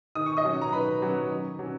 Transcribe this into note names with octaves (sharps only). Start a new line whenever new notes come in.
D#3 D#6
C#6
D#5 D#6
F#3 C#4
A#5
D#3 B4 B5
F#3 C#4
D#3
F#3 C#4